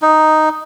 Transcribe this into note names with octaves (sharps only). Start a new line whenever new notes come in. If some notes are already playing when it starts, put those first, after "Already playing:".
D#4